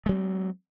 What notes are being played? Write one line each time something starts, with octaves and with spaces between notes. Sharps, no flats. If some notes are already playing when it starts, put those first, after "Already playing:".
F#3 G#3 C4